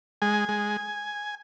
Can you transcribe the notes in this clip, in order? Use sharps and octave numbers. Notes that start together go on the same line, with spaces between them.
G#3 G#5
G#3